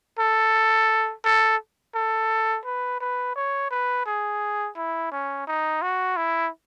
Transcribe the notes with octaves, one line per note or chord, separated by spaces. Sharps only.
A4
A4
A4
B4
B4
C#5
B4
G#4
E4
C#4
D#4
F#4
E4